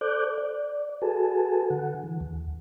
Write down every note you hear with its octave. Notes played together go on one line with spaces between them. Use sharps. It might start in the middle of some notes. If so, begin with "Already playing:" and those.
A4 C5 D5 D6 F#6 G6
D5
F#4 G#4 A4 B4 G#5 A5
D3 F#5
E3
D#2